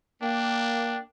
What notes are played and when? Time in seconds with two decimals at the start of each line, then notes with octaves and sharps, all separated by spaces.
0.22 A#3 D4 G5